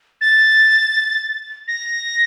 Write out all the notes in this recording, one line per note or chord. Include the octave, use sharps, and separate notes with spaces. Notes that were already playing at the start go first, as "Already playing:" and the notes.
A6
A#6